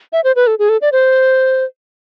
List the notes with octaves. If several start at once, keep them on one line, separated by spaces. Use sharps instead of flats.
E5
C5
B4
A4
G#4
A4
D5
C5